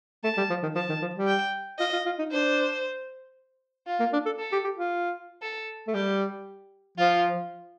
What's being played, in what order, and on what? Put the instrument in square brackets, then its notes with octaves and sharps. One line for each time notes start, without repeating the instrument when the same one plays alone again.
[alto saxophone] A3 [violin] A5
[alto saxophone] G3
F3
D#3
[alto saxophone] F3 [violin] A5
[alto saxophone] D#3
F3
G3
[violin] G5
[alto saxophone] F4 [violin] D#5
[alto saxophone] F4
F4
D#4
[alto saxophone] D4 [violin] C5
[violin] F4
[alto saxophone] A#3
D4
A4
[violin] A4
[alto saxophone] G4
G4
F4
[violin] A4
[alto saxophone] A3
[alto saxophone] G3 [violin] G4
[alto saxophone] F3 [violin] F4